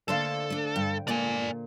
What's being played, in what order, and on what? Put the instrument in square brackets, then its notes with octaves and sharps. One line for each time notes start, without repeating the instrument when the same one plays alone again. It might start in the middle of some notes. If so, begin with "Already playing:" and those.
[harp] D3 C5 F5 [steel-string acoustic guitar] A3 A#3 D4 [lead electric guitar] A4
[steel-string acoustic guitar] A3 D4
[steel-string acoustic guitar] G2 [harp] G5
[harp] A#2 [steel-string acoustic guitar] G#3 G#4 A4 [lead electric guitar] D5 G#5